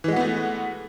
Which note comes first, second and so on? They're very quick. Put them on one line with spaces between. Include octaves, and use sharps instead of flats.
E3 G#3 F#4 B3 A3